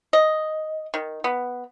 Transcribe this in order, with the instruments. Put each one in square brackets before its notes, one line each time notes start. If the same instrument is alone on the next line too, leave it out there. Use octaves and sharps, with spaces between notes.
[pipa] D#5
D#3
B3